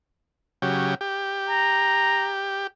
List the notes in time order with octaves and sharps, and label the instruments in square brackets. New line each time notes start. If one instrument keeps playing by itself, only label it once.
[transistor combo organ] C#3 F#3 G4
G4
[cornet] A#5